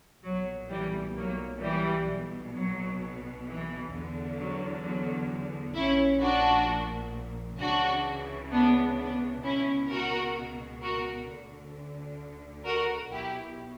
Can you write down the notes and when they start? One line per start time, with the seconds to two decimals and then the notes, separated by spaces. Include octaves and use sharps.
0.23 B1 A#2 F#3
0.69 E3 G3
1.16 F#3 A#3
1.61 E3 G3
2.08 B1 B2
2.54 F#3
3.46 E3
3.91 E2 D3
4.38 F#3
4.84 F#3
5.75 A#1 A#2 C#4 E4
6.21 D4 F#4
7.59 C#2 C#3 E3 D4 F#4
8.52 B3 D4
8.97 B3 D4
9.43 C#2 B2 C#4 E4
9.89 F#4 A#4
10.82 F#4 A#4
11.28 D2 D3
12.66 F#4 A#4
13.12 B1 B2 E4 G4